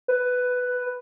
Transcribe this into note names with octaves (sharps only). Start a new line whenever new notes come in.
B4